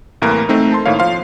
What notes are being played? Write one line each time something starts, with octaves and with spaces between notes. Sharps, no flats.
C2 A2 E3 A#3 A#4
A3 C4 D#4
A5 C6
A2 D#3 A#3 C#5 F5
F3 F5 C6